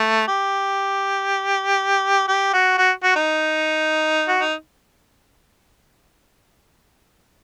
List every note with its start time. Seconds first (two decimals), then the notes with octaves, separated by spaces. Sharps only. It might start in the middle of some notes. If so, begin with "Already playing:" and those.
Already playing: A3
0.28 G4
2.28 G4
2.53 F#4
2.78 F#4
3.03 F#4
3.16 D#4
4.28 F#4
4.41 D#4